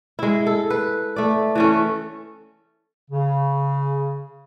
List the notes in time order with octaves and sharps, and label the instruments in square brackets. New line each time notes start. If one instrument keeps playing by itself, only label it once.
[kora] G#3 E4
A4
B4
A3 D5
E3 A3 C#4
[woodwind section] C#3